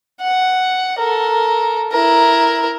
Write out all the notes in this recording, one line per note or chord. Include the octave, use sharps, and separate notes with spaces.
F#5
A4 A#4
E4 A#4